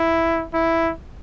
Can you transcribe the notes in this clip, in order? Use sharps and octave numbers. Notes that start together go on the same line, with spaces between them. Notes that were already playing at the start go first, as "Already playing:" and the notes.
Already playing: E4
E4